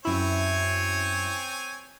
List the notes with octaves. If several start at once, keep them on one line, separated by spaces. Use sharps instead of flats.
F#2 C4 E4 C#5 G#5